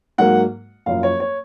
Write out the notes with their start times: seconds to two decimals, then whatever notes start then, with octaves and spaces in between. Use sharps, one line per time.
0.18 G#2 F#3 A#3 F#5
0.86 F#1 F#2 F3 F5
1.03 C#5
1.20 C#5